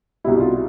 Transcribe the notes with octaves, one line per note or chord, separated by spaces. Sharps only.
C2 B2 G3 E4
F4